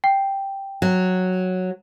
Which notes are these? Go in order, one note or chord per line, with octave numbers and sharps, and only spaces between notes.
G5
F#3